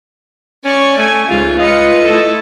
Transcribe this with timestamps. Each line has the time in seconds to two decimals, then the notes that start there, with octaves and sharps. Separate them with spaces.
0.65 C#4 D5 C#6
0.98 A3 G#5
1.29 C#2 G#2 C#3 F4
1.60 F4 B4 D#5 C#7
2.05 A3 E4 A4